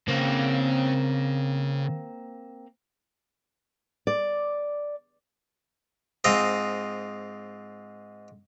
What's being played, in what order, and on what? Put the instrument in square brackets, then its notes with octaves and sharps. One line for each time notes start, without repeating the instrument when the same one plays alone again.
[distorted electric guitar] C#3 [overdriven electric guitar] A#3 C4
[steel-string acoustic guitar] D5
[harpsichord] G#2 C4 F4 D#5